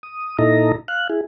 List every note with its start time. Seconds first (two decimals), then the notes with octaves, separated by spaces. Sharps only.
0.03 D#6
0.39 A#2 D#4 E4 A4 D#5 A#5
0.88 F5 F#6
1.10 E4 G#4